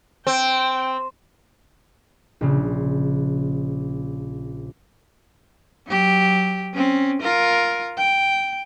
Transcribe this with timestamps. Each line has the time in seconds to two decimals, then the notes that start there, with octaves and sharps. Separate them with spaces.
0.27 C4 G5
2.41 A#1 C#3
5.86 F#3 G4
6.73 C4 C#4
7.22 F4 A#4
7.97 G5